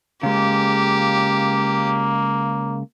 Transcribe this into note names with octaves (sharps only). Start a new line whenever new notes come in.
C#3 G#3 A#3 G4